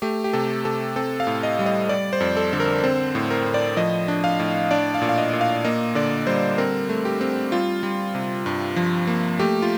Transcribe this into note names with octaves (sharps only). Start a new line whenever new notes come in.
A3 G4
G4
C3 A4
C3 A4
C4 A4
F5
A2
D#5
G3
D#5
G3 D5
C5
F2
A4
D3
A#4
C4 C5
A2
A#4
A2
D5
F3 D#5
D4
F5
A2
D4 D5
F5
A#2
F5
D#5
A#2
F5
A#3 D#5
D3 D5
G3 C5
C4 A#4
A3
G4
C4
G3 F4
G3
C3
G2
F3
A#3
A3 G4
F4